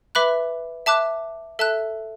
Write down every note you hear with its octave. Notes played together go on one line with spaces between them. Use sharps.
B4 E5 B5 D6 F#6
E5 A5 D6 F#6
A4 E5 A5 F#6